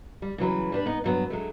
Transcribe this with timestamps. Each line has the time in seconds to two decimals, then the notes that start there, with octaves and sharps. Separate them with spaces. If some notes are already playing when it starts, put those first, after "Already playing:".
0.22 G3
0.38 C#3 E3 F#3 B4
0.72 G3 D4 B4
0.86 B3 D#4
1.04 G2 F#3 B3
1.30 F#3 G#3 A3